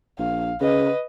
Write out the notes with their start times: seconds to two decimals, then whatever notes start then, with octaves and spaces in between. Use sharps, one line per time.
0.19 A#1 F5
0.61 C#3 B4 D#5